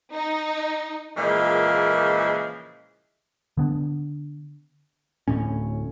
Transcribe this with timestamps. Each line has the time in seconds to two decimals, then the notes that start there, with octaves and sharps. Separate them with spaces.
0.11 D#4
1.17 A#2 C#3 E3 F3 G#3 A#3
3.57 D3 B3 D4
5.28 D1 A2 C#4